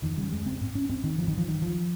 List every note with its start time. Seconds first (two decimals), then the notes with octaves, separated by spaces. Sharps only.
0.02 F2 D#3
0.17 C#3 G3
0.31 F2 G#3
0.46 C#3 C4
0.61 G#2
0.75 C#4
0.89 G#2 C4
1.04 D#3
1.18 G2 F3
1.28 D#3
1.38 F3
1.47 G2 D#3
1.62 F3